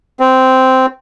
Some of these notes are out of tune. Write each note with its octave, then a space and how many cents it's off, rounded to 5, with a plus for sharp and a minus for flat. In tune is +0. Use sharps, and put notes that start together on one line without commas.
C4 -10